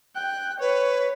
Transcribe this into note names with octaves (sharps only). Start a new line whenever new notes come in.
G5 F#6
B4 C#5